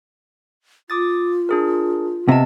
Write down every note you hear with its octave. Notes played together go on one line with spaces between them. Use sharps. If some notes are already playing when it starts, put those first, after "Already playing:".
F4 D6 D#6 A6
D4 G#4 A#4
C3 B3 D#5 A5